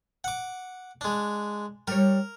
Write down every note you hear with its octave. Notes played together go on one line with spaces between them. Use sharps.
F#5 D6
G#3 D4
G3 A#4 C#5